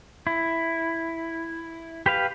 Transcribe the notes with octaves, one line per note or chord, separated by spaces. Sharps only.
E4
G4 B4 F5